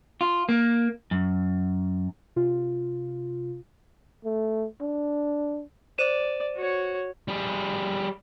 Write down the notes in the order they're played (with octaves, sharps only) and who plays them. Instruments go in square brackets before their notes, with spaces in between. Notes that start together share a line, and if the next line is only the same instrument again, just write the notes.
[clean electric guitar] F4
A#3
F#2
[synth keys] C3 F4
[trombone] A3
D4
[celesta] C5 D#7 E7 [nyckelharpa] D5
[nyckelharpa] F#4 C#5
[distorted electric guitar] G3 G#4